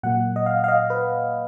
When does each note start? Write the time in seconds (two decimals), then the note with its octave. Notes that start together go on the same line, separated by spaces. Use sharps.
0.03 A#2 F#3 A#3 F#5
0.36 D#5
0.46 F5
0.64 F5
0.68 D#5
0.90 B4